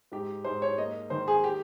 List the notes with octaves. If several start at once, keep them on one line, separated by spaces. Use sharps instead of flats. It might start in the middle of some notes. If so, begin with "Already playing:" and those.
G#2 G4
G#2 C5
C#5
A#3 D#5
D#3 C5
G#4
G4